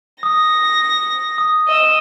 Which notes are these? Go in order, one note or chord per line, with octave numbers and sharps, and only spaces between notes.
D#6 A#6
D#6
D#5 E6